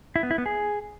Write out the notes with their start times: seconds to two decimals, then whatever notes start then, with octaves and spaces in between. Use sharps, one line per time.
0.16 E4
0.23 B3
0.31 E4
0.38 B3
0.46 G#4